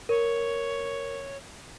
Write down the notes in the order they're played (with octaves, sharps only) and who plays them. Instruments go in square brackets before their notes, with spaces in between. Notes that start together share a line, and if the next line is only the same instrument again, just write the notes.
[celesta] A#4 [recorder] C#5